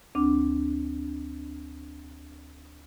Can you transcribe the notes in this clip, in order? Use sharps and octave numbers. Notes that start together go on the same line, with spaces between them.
D2 C4 D4 D6